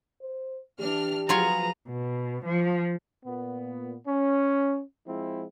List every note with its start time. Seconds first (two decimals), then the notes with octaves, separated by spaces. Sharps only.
0.22 C5
0.80 E3 D4 G4 F6
1.29 F3 F#3 F4 G#4 B4 C#5 A#5
1.89 B2
2.46 F3
3.24 A#2 B3
4.06 C#4
5.06 F3 G#3 C4 E4